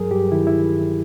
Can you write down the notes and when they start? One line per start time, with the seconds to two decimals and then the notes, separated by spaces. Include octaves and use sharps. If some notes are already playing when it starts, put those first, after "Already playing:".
Already playing: G2 F#3 G#4 A#4
0.11 G2 G4
0.32 D#3 E4
0.47 E4